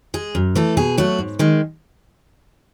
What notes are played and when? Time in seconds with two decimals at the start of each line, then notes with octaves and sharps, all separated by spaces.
0.14 G#3 G#4
0.35 F#2
0.55 E3 A3 A4
0.77 B2 G#4
0.97 F#3 A3 F#4
1.19 G#2
1.39 D#3 G#3